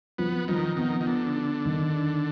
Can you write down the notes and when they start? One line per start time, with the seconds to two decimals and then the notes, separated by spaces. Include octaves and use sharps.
0.18 F3 B3
0.48 D#3 F3
0.77 D#3 B3
1.01 D#3
1.06 D3 B3
1.36 D4
1.65 D#3
1.94 D4